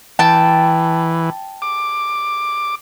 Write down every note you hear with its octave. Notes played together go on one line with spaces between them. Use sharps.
E3 G5 A5
D6